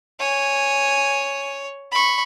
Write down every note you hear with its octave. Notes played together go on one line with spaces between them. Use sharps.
C#5 G#5
B5 C#6